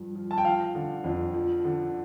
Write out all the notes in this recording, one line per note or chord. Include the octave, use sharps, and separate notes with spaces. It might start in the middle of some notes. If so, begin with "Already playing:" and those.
Already playing: G2 F3
F3
A5
G5
F3 F5
D3
F2
F3
D3